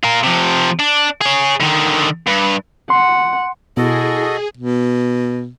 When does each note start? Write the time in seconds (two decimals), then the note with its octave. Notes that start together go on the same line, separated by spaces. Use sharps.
0.03 F4 A#4
0.24 C3 F3
0.79 D4
1.21 G#4 C#5
1.60 D3 D#3
2.27 G2
2.90 F#5 C6
3.77 B2 E4 F#4 G#4 A4 D#5
4.57 B2